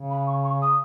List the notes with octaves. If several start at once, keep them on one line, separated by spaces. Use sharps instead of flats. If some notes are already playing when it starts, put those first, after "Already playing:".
Already playing: C#3
B5
C#6
C#6
D#6